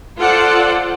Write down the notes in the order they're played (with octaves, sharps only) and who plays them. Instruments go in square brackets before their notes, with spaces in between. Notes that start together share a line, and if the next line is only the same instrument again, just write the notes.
[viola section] F4 A4 C5 D5 F#5